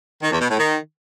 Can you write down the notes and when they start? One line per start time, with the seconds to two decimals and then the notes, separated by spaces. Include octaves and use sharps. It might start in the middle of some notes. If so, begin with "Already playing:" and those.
0.22 D#3
0.31 E2
0.40 B2
0.50 A2
0.59 D#3